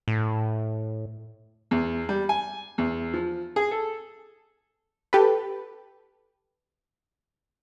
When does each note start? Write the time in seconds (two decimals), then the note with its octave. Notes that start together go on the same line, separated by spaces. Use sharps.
0.08 A2
1.71 E2
2.09 G3
2.29 G#5
2.78 E2
3.14 F3
3.56 G#4
3.71 A4
5.13 G4 A4 B4